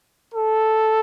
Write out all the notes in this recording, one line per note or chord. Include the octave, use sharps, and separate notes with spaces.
A4